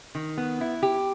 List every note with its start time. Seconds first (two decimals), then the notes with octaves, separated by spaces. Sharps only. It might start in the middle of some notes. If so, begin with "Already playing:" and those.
0.15 D#3
0.37 B3
0.61 E4
0.83 G4